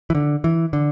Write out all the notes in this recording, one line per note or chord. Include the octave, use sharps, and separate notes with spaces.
E3
D3
E3
D3